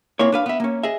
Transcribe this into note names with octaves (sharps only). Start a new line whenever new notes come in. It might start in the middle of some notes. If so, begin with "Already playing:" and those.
A#2 A#3 C4 E4 C#5
D4 B4 F5
B3 E5
A#3 C#4
G#4 D#5 E5